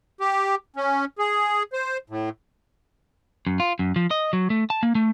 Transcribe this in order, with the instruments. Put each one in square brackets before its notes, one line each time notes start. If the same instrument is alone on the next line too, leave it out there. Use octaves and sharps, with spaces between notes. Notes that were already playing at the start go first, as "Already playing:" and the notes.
[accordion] G4
C#4
G#4
C5
A2
[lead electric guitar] F#2
F4
F#2
F3
D#5
F#3
A3
A5
A#3
A3